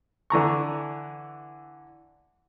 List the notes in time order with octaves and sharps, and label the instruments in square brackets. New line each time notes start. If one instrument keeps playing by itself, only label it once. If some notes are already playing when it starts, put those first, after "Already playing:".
[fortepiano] D3 E3 A#5 C#6